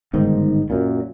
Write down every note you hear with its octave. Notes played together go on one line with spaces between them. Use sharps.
G1 G#2 D#3
F#2 A#2